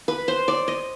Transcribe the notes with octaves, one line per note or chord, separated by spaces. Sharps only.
B4
C5
D5
D#5